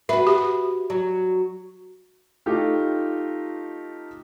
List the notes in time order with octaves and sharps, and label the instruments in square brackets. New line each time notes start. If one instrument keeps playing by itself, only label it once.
[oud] F#4 B4 [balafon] E5
[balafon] G4
[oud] F#3
[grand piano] A3 D#4 F4 G4 A4